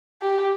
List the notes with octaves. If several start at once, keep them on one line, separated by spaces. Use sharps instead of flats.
G4